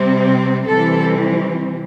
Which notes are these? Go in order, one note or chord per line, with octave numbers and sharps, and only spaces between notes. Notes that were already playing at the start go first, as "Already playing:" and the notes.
Already playing: C3 G3 C4
C3 E3 G3 C4 A4